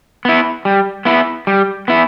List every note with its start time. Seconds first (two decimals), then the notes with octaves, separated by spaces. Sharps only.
0.25 B3 E4
0.65 G3
1.05 B3 E4
1.47 G3
1.88 B3 E4